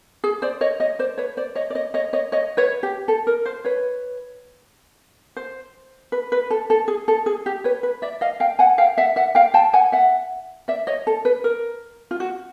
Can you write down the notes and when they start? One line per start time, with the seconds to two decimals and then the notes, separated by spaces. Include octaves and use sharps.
0.24 G#4
0.42 C5 D5
0.61 C#5 D#5
0.80 C#5 D#5
0.99 C5 D5
1.18 B4 C#5
1.37 C5 D5
1.55 C#5 D#5
1.70 D5
1.75 C#5 D#5
1.94 C#5 D#5
2.13 C#5 D#5
2.32 C#5 D#5
2.57 B4 C#5
2.83 G4
3.08 A4
3.27 A#4
3.46 C5
3.65 B4 C#5
5.37 C5
6.12 B4
6.32 B4
6.51 A4
6.70 A4
6.88 G#4
7.08 A4
7.26 G#4
7.46 G4
7.64 B4 C#5
7.83 B4
8.02 D5 E5
8.21 D#5 F5
8.40 F5 G5
8.59 F#5 G#5
8.78 F5 G5
8.98 E5 F#5
9.16 E5 F#5
9.35 F5 G5
9.54 G5 A5
9.73 F#5 G#5
9.92 E5 F#5
10.68 D5 E5
10.87 C#5 D#5
11.07 A4
11.25 B4
11.44 A#4
12.11 F4
12.20 F#4